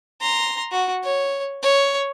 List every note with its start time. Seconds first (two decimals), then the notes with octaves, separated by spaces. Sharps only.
0.21 A#5 C6
0.72 F#4
1.03 C#5
1.63 C#5